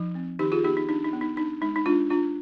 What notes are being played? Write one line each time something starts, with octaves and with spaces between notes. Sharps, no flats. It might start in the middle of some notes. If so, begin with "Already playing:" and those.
Already playing: F3 D#4
C4
D#3 D#4 G4
F4 G#4
B3 D#4 G4
D#4
D4 D#4
D#4
B3
D#4
D4 D#4
G#3 D#4
D#4
G#3 D4 F4
D4 F4